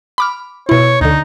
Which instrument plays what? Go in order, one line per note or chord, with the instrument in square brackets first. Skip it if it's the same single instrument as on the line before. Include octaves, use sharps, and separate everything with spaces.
[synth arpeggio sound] B5 D6 F6
[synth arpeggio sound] B2 E4 [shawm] C#5
[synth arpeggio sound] D2 D3 [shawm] D#4